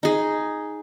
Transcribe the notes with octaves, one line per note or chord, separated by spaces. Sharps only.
D#4 G#4